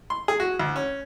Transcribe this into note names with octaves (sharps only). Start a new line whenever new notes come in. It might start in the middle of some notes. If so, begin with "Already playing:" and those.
C6
G#4
F#4
D2
C#4